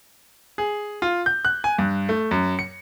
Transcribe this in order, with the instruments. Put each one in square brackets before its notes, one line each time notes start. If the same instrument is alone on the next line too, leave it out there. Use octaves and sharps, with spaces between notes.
[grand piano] G#4
F4
G6
F#6
G#5
G2
A3
F#2
C#7